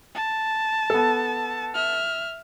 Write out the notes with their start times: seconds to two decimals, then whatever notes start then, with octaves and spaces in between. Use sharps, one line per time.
0.15 A5
0.90 B3 A4
1.74 E5 F6